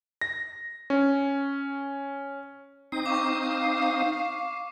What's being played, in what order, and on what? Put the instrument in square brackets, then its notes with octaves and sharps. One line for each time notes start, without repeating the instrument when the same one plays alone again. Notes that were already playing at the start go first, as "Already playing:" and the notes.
[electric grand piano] A#6
C#4
[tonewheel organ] C4 D#4 D#6 [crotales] C7
[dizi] F5 [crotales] C#6 D6